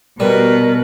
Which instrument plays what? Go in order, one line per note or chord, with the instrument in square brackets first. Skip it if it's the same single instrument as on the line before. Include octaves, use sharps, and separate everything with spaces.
[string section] B2 [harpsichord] G3 [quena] A#4 [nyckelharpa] B4